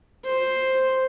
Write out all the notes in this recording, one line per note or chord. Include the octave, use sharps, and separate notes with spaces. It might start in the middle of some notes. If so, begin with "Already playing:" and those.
C5